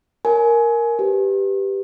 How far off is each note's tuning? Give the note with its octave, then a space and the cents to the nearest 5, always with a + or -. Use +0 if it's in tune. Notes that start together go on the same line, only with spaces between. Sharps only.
A#4 +0 C#5 +0 G#5 +20
G4 +0 B4 +0